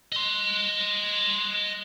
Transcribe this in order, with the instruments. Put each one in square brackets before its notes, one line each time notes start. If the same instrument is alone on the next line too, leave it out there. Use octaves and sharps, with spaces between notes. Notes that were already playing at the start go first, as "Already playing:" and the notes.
[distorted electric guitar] D#5 C6